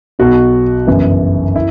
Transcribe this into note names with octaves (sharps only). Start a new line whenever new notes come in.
B1 B2 F#4
G1 F#2 C#3 E3
E4